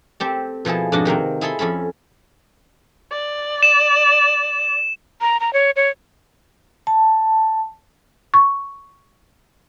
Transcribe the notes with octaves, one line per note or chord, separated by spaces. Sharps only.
C4 G4 A4
B2 F3 E4 G#4 A4
F2 G#2 B2 D4 F#4 D#5
C3 D#3 A#3 C4
E4 G#4 A4 B5 C6
F2 C#4 A4 B5
D5
E7
A#5
A#5
C#5
C#5
A5
C#6